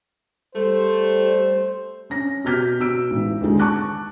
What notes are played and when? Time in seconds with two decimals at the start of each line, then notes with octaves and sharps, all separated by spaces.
0.55 G3 A3 C5
2.10 C#4 A#6
2.44 B2 G4 F6 G6 B6
2.80 B2 E6 D7
3.11 A1 G#2
3.41 D#2 D3 G#3
3.59 A5 C#6 D6 F#6